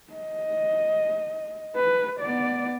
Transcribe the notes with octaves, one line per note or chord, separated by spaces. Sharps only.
D#5
B4
B3 D5